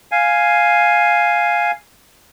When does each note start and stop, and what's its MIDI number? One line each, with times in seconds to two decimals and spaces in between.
0.12 1.71 77
0.12 1.71 80